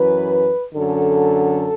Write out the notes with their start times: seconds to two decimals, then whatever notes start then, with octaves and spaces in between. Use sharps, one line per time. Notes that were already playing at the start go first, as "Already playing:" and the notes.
Already playing: F#2 E3 B4
0.75 F#2 D3 A4